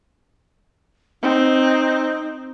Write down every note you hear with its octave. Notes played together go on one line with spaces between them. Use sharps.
C4 D#4